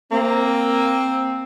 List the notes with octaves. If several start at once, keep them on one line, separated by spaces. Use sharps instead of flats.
A#3 C4